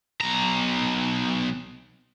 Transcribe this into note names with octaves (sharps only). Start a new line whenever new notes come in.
B1 A#5